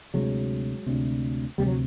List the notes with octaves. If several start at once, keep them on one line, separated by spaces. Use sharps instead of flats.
D2 C3 F#3 G#3
D2 C3
D2 C3 G3
F#3